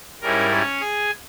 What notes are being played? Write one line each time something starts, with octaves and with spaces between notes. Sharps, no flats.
G#2 G3 C#4 E4 A#4
C#4 C#5
G#4 G#5